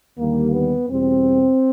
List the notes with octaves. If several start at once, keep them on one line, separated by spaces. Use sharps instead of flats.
D#2 D3 G3 A#3
B3
E2 B2 G3 C4